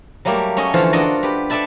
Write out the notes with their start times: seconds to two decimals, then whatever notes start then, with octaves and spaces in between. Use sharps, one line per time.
0.25 F#3 G3 A3 A#3 G4
0.57 A3 C#4 C#5 D#5
0.74 D3 E3 F3 F4 A4 F5
0.93 D4 F4 F#4 A4 A#4 D#5
1.23 G4 B4
1.50 A4 B4 D5 E5 A5 B5